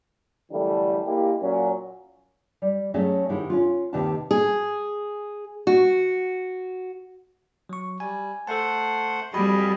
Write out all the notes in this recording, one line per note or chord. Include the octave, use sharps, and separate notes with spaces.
F#2 D3 E3 G3 A3 D4
G#3 A#3 E4 G4
A#2 F#3 C#4
G3
F#3 A3 C#4 G#4 D#5 E5
G#2 C3 D#3 G#3 E4
C#4 F4
D#2 C3 D#3 B4 F5 A5
G#4
F#4
F#3 C#6
G3 G#5
A3 A4 C5 F#5 A5
F2 G3 F#4 G#4 D#5 G#5 B5